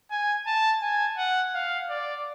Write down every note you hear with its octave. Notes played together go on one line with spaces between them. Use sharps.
G#5
A5
G#5
F#5
F5
D5